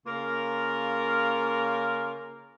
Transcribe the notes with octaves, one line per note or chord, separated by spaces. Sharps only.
C#3 A#3 F4 A#4